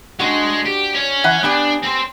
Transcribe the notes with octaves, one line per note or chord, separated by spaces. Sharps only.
G#3 C4 D4 F#4 G#4
G4
C#4 C#5
E3 F#5 A#5
B3 D4 G4 G#5
C4 C5